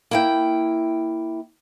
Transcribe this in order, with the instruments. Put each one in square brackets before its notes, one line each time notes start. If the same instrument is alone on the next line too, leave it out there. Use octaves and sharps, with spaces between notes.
[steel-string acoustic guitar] A#3 E4 G5